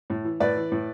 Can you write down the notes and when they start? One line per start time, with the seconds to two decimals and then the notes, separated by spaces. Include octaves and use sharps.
0.10 A2
0.25 E3
0.40 A2 B4 D5
0.56 E3
0.72 A2